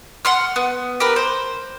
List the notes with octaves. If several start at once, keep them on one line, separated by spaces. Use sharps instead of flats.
F#5 C6 F6
B3
G4 A#4 B4
C5